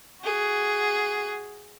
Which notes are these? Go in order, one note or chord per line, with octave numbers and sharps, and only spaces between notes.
F#4 G#4